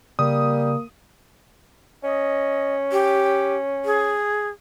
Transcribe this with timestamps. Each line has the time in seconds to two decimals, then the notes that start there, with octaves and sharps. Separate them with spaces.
0.19 C#3 G3 A#3 D#6
2.03 C#4 D#5
2.92 G4
3.85 G#4